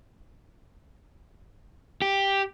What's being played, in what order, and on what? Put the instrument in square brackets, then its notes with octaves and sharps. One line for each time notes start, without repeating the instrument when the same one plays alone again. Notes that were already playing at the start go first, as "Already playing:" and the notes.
[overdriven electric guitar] G4